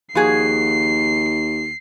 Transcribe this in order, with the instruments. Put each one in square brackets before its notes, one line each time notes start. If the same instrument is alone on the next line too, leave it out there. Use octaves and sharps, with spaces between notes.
[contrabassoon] D#2 [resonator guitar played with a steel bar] F3 F#4 G#4 [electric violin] C7